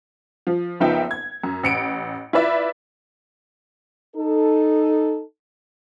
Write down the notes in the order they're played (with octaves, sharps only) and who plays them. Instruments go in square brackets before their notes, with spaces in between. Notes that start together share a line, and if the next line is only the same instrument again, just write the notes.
[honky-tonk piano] F3
F#1 F3 B3 D#4 E5 G5
G#6
F#2
A1 C#7 D7
E4 F4 B4 D5 E5
[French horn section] D#4 A4